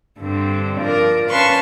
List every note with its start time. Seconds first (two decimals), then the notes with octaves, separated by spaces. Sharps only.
0.19 G2 D3 C4
0.82 F3 A#4 D5
1.31 C#4 B4 F5 A5 C6 C#6